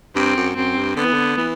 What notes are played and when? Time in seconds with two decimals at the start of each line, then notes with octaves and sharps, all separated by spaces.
0.15 G2 C4
0.37 F#2
0.56 F#2 C4
0.76 G2
0.96 D3 B3
1.05 E3
1.13 D3
1.37 E3